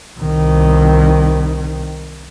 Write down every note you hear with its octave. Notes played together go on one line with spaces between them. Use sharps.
C2 D#3